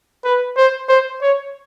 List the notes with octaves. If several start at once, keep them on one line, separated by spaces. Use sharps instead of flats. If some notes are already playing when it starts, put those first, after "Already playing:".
B4
C5
C5
C#5